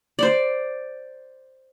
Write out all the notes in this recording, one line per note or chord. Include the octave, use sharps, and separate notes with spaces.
C5 D5